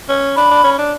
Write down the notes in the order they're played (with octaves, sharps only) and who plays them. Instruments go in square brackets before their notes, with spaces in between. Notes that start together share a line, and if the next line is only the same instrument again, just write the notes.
[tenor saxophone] C#4
[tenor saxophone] D4 [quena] B5
[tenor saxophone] D4
C#4
D4